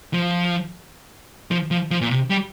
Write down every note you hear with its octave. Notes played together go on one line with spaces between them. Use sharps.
F3
F3
F3
F3
A#2
C3
G3